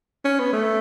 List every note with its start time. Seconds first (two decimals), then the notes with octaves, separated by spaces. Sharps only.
0.25 C#4
0.39 B3
0.53 A3